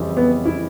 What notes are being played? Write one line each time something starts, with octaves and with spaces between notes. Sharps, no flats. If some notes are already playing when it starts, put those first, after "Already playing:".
Already playing: F2 C#3 E3 G3
B3
E4